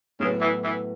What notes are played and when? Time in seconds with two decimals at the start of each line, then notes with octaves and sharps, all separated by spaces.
0.20 A2 C#3 F#3 B3
0.41 E3
0.64 E3